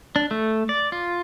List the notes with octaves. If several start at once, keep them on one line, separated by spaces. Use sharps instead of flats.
D4
A3
D5
F4